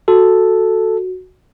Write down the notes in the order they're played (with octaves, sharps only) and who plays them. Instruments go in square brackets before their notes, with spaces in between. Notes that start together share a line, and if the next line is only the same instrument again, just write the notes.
[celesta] F#4 [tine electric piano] A4